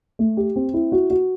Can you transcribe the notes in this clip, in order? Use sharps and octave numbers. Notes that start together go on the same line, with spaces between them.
A3
G4
C4
E4
F#4
F#4